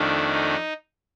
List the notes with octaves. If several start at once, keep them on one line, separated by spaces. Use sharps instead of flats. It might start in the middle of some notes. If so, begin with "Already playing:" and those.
Already playing: F2 D#3 A3 D4
D#4